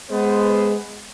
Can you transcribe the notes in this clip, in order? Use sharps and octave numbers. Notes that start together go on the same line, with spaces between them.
G#3 B3 C5